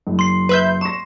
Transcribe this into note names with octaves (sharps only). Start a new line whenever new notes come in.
F#1
C6 C7
B4 E5 G6
C#6 A#6 E7